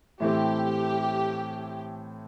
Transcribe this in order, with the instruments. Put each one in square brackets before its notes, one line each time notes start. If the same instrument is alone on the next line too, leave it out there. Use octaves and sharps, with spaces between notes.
[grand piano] A2 E3 A3 C4 [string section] G4